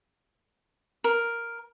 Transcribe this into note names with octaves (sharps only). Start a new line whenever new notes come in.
A#4